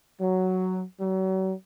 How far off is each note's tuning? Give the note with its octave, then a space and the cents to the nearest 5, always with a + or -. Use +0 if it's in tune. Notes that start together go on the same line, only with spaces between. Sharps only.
F#3 +5
F#3 +40